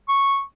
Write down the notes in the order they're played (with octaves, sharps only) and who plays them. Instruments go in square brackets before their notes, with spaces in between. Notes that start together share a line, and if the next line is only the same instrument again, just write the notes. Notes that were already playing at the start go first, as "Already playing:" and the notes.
[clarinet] C#6